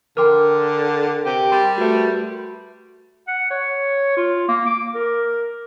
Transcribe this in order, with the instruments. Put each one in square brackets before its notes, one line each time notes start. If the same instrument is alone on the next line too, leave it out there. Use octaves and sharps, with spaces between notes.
[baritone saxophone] D3 [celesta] A#4 G5 [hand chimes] C6 D6 F6
[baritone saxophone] C3 [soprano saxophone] G4
[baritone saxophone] G3 [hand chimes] C6
[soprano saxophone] A3 [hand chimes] F#4 B4
[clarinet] F#5
C#5
F4
A#3
D6
A#4